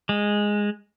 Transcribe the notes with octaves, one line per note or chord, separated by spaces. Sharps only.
G#3